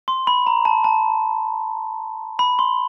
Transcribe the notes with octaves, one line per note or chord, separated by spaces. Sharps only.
C6
B5
A#5
A5
A5
B5
C6